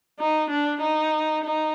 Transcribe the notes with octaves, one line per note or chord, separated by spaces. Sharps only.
D#4
D4
D#4
D#4